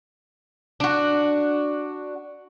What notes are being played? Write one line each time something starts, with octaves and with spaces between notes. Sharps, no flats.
D4 F#4